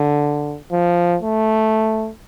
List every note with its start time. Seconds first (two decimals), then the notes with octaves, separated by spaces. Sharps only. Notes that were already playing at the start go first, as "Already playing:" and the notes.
Already playing: D3
0.72 F3
1.22 A3